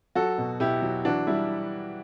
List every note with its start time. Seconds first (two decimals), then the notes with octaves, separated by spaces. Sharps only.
0.15 F#3 F#4 A4
0.38 B2
0.60 B2 E4 G4
0.82 F#3
1.05 E3 D4 F#4
1.27 G3 E4